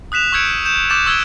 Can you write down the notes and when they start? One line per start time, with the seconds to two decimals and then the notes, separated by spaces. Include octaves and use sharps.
0.12 D#6 F#6 B6 E7 F7
0.32 C#6 E6 G6 G#6 C#7 D7
0.65 G6 E7
0.90 C#6 D6 E6 G6 A6 E7
1.06 C#6 E6 G#6 D7 G7